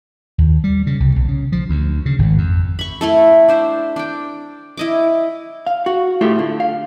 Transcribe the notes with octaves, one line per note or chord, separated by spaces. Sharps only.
D#2
G3
C#3
C2
B1
C#3
F3
D2
C#3
G#1
F2
B5 C#6
A3 E4 A4
D4 C5 E5
D4 G5
E4 D#5 D6
F5
F#4
A2 A3 F4 G4 E5
D3
F5